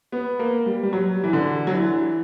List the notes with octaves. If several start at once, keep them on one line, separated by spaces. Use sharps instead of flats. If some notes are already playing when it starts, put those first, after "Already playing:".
B3
A#3
G3
G3
F#3
E3
D3
F#3
E3